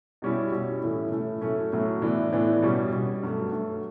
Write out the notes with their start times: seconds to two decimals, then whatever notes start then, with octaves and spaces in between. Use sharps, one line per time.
0.22 B2 G3 C#4 E4
0.51 B2 G3 C#4 E4
0.82 A2 E3 A3 C#4 E4
1.11 A2 E3 A3 C#4 E4
1.41 A2 F#3 A3 C#4
1.72 A2 F#3 A3 C#4
2.02 A2 E3 B3 D4
2.32 A2 E3 B3 D4
2.62 B2 G3 C#4
2.93 B2 G3 C#4
3.23 G2 F#3 A3
3.52 G2 F#3 A3